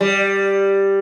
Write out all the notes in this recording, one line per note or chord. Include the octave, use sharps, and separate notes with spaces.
G3